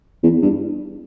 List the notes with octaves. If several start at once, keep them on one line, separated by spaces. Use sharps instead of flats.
E2
G2